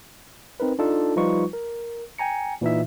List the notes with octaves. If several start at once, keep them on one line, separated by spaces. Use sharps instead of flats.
C4 D#4 A#4 B4
D4 D#4 F4 A4
F3 G3 D#4 F4 B4 C#6
A#4
G5 G#5 A#5 C#7
A#2 E3 D#4 E5